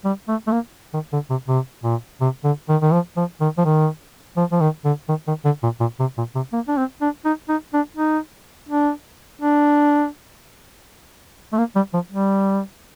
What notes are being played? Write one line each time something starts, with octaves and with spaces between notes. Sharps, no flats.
G3
A3
A3
A#3
D#3
D3
C3
C3
A#2
C3
D3
D#3
D#3
F3
F3
D#3
F3
D#3
F3
F3
D#3
D3
D#3
D#3
D3
A#2
A#2
C3
A#2
C3
A#3
D4
C4
D4
D#4
D#4
D4
D#4
D4
D4
A3
A#3
G3
F3
G3